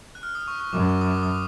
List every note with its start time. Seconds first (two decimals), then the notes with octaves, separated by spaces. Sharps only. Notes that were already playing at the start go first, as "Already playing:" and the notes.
0.15 F#6
0.23 F6
0.35 D#6
0.48 C#6
0.60 C#6
0.73 F#2 D6
0.89 C#6
1.01 D#6
1.06 D6
1.23 D#6